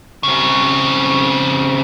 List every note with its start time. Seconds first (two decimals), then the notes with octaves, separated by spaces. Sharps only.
0.23 C#3 C4